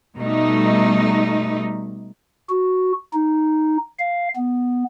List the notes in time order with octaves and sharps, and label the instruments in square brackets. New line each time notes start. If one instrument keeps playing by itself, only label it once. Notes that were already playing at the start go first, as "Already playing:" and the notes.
[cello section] B2 G3 A3 D#4
[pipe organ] F#4
D#4
F5
B3